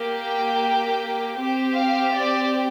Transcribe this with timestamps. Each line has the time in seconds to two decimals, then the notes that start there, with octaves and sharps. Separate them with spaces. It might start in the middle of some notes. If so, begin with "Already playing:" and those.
Already playing: A#3 G4
0.22 G5
1.37 C4 G4
1.74 F5
2.13 D5